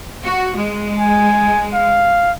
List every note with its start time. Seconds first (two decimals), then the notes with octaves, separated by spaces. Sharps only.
0.25 F#4
0.55 G#3
0.99 G#5
1.73 F5